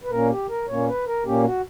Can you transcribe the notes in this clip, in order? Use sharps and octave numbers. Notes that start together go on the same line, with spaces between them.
B4
A#2 A#3 C#4 A#4
G4
A#4
A#2 A#3 C#4 C#5
B4
A#4
A#2 A#3 C#4 G4
F#4